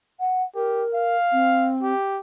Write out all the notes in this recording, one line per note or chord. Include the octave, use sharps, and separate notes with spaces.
F#5
G4 A#4
F5
C4
G4